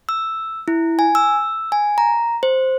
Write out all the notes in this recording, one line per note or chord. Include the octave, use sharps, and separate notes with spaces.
E6
E4
G#5
E6
G#5
A#5
C5